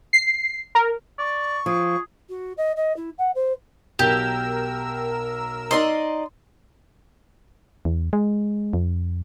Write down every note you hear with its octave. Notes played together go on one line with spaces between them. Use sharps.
C7
A#4
D5 C#6
F3 G#4
F#4
D#5
D#5
E4
F#5
C5
B1 G4 A#4 E6
D#4 D5 D#5 C6
E2
G#3
F2